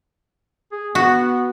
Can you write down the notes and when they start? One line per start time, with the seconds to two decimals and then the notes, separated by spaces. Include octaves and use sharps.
0.72 G#4
0.95 B3 F#4